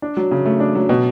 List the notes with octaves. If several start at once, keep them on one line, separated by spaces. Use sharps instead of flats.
D4
F#3
C#3
A3
D4
F#3
B2